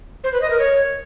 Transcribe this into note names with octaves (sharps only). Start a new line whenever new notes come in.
C5
B4
D#5
A#4
C#5